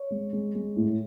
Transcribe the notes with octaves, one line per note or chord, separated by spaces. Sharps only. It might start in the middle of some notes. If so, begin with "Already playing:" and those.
Already playing: C#5
G#3
G#3
G#3
A2